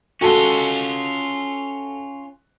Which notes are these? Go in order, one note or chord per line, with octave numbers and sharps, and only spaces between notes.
C#4 F4 F#4 A4